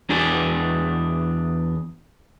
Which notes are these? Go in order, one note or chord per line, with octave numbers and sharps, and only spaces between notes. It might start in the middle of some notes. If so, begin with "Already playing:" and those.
E2 D4 G#4